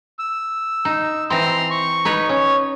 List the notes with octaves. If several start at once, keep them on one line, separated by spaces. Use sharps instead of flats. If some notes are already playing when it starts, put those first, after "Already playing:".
E6
D#4
E3 C4 A#5 C6
C#6
D#4 B4 C#5
C#4 C#5